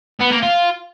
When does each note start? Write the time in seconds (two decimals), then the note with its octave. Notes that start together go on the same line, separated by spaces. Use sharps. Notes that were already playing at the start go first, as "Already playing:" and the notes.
0.20 B3
0.31 A#3
0.43 F4